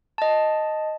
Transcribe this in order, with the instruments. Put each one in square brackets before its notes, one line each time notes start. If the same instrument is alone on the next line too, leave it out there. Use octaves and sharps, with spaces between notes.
[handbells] D#5 A5